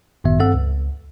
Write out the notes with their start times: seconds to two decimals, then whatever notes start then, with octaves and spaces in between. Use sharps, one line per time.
0.24 G#1 F#2 A2 D#3 B3 E5
0.39 G2 C4 A4 F#5 E6
0.54 C#2